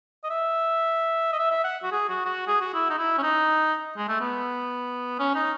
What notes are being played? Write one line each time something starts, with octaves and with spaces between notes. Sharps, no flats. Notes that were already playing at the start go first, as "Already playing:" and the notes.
D#5
E5
D#5
E5
E5
F#5
F#4
G#4
F#4
F#4
G#4
F#4
E4
D#4
E4
C#4
D#4
G#3
A3
B3
C#4
D#4